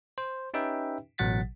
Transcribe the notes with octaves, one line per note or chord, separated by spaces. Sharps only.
C5
C#4 D#4 G4 B4 E5 G5
A1 B2 F#3 F#5 A6 B6